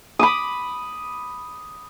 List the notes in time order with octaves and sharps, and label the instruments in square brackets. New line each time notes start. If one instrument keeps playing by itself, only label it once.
[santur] B5 D6 D#6